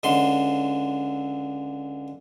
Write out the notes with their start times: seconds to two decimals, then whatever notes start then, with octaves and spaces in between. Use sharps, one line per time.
0.03 C#2 D3 C6